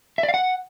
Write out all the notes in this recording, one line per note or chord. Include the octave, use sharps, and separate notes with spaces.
E5
D5
F5
F#5